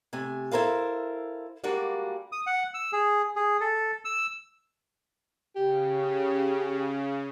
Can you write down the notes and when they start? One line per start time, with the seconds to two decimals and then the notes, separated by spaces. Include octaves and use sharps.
0.13 C3 A3 G#5
0.51 E4 A4 A#4 C5 F5
1.64 G3 G#3 A#3 D4 F#4
2.32 D#6
2.47 F#5
2.74 E6
2.92 G#4
3.36 G#4
3.61 A4
4.05 E6
5.56 C#3 G4